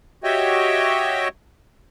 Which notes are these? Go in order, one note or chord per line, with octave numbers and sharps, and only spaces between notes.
F#4 G4 C#5 D#5 E5 G5